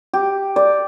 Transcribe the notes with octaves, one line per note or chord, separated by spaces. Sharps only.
G4
D5